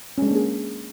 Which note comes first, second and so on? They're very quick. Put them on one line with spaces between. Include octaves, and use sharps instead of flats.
C#4 G#3 D4 A#3 G#4